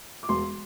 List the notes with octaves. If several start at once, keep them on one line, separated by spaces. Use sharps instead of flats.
D6
E1 C6